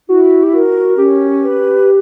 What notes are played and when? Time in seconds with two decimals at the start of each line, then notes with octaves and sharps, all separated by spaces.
0.09 E4 F#4
0.43 G4
0.53 F#4 A#4
0.98 C#4 G4
1.42 B4